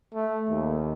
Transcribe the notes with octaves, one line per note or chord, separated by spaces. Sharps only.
A3
D#2